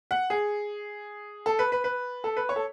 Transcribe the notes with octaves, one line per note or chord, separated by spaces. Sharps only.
F#5
G#4
A4
B4
B4
B4
A4
B4
C#5
A4